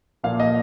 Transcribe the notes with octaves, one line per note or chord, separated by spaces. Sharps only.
A#2 F3 A#3 F5
D#5